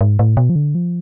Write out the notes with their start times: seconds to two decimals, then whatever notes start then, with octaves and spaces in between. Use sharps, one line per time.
0.01 G#2
0.19 A2
0.37 B2
0.50 F3
0.56 D3
0.75 F3